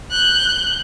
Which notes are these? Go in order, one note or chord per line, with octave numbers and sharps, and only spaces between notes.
F#6 G6